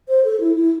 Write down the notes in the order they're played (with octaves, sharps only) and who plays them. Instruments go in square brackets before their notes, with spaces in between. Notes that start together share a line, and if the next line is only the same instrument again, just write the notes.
[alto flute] C5
A4
E4
E4